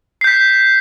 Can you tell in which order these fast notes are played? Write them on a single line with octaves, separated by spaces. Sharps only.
C7 G6 B6